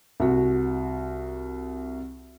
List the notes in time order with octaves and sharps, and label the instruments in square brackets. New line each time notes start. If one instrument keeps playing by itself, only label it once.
[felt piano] C2 F#4